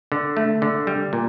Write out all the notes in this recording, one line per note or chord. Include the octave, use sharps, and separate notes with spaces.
D3
A3
D3
G3
A#2